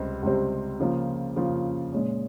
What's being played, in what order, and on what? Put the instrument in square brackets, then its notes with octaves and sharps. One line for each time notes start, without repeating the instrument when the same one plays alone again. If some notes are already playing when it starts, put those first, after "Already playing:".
Already playing: [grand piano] C#2 C3 G3 C4
C#2 C3 G3 C4
C#3 F3 A#3 F4
C#3 F3 A#3 F4
A#2 G#3 C#4